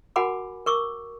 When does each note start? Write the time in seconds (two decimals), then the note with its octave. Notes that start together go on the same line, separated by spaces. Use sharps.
0.16 F#4 A#4 F#5 G#5 B5 D6
0.66 A#4 C#6 D6 E6